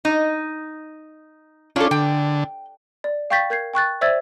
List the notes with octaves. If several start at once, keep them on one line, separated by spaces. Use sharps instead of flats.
D#4
C#4 D4 F4 A4
D3 G5
D5
F5 G5 C#6 G6 A6 B6
A#4 G6 G#6 C7
G5 C#6 F#6 A6
C5 D5 E5 E6 G#6 A6